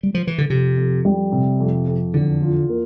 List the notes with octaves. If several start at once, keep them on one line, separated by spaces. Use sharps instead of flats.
G3
F3
E3
D3
F2 C3
F2
G3
C3
F2
F2
E2 D3
F4
A#3